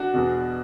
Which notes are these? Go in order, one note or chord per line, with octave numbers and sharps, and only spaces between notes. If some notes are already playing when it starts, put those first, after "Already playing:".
Already playing: D4 F#4
E2 B2